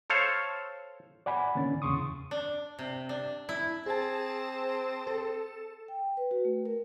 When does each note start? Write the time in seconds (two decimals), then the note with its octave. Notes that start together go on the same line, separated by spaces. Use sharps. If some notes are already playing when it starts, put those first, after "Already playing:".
0.10 A4 C5 C#5 F5
1.26 D5 F#5 G#5 B5
1.55 D3 D#3 A#3 C#4 A6
1.82 E2 C#3 C6 C#6 D#6
2.31 D4
2.79 C3
3.09 D4
3.49 E4
3.86 C4 G#4 A5
5.07 A4
5.88 G5
6.17 B4
6.31 F#4
6.45 A3
6.65 A#4